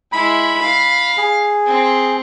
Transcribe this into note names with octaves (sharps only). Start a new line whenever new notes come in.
G#3 E4 B5
F5
G#4
C4